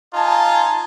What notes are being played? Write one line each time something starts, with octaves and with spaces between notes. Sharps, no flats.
D#4 F4 G#5 A5